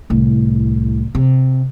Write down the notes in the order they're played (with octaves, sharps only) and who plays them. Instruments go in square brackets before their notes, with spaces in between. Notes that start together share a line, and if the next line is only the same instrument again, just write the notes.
[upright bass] C2 A2
C3